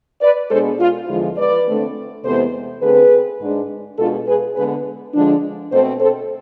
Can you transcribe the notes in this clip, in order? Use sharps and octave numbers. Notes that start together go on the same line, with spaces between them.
B4 D5
B2 G#3 B3 D4 A4 C5
F4
E2 D3 F3 G#3 F4
B4 D5
D3 A3 C4
E2 C3 G#3 B3 A4 C5
D3 A3 C4 G#4 B4
G#2 G#3 D4
B2 G#3 D4 F4 A4
G#4 B4
D3 G#3 B3 G#4 B4
D3 F3 G#3 D4
B2 A3 C4 A4 C5
A4 C5